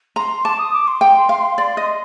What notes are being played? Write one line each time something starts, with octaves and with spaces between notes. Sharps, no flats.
A#5 C6
A5 D6
D#6
D6
C6
G5
F5
D5
D#5